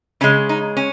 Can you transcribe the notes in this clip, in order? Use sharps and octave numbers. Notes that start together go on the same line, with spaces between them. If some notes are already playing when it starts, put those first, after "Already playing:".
C#3 G#3 C#4
D#4
C#4